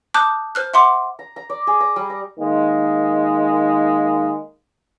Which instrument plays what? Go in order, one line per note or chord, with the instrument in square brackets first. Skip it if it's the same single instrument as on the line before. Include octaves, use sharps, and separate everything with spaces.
[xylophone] A5 D6 D#6 F#6 G6
C5 F6 F#6
E5 F#5 C6 D6
[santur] A#5
A#5
D5
G#4
A#5
G3
A#5
[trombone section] D#3 G#3 A#3